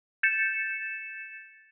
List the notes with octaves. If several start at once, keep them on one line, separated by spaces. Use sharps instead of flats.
G6 A6 C#7 E7